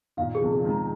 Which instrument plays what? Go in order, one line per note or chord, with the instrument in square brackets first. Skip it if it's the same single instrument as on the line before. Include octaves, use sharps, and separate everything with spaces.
[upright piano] A#2 D#3 [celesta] F5
[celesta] G#4
[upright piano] C3 F3
[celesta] G#4
[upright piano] F3
D#3 G#3
[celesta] A#5